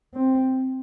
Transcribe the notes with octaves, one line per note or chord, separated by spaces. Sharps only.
C4